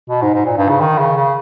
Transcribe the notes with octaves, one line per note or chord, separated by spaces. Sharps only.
B2
G#2
G#2
A#2
G2
C#3
D#3
C#3
C#3